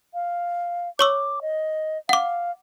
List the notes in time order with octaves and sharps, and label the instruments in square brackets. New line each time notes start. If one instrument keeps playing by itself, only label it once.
[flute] F5
[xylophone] C#5 C#6 E6 [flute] D6
[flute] D#5
[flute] F5 [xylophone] F#5 D6